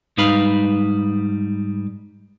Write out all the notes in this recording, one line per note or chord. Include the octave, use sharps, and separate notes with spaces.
G#2 G3 D#4 B4 F5 B5